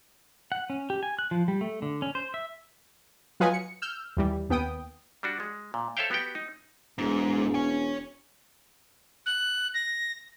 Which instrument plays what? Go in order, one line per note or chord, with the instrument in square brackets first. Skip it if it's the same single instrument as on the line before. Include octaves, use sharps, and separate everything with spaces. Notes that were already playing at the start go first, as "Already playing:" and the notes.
[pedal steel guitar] F#5
C#4
G4
G#5
F#6
F3
G3
A3
D3
C#4
C5
E5
[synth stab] F#3 F4 B4 D#5 F#5 G#5
C#7
E6 F6 G6
D#2 E3 G3
D#2 B3 G5 D#6
[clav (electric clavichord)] G3 D4 F#4
G#3
A#2
A4 C5 C#5 E5 F5 G5
B3 F#4 G4 G5
D#4
[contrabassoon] E1 [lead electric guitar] G#2
[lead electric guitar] C#5 G#5
[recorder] F#6
A#6